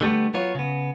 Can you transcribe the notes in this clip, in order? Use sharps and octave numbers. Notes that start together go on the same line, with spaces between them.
D3 G3 A3 B3
F#3 B3 F4 C#5
C#3 B3